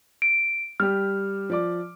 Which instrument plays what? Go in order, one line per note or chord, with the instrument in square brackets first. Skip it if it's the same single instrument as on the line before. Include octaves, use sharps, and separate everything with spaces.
[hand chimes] D7
[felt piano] G3 G4 [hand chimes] F6
[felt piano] F3 D5 D6